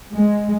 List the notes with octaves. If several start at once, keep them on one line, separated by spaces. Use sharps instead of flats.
G#3